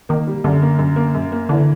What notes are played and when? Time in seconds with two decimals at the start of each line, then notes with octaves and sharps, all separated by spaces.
0.09 D#3 A#3
0.27 G3
0.44 F#2 D3
0.62 A#3
0.79 F#2
0.96 A#3
1.15 F#2
1.32 A#3
1.49 D3 E3